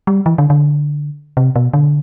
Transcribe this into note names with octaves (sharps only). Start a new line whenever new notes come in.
G3
E3
D3
D3
C3
B2
D3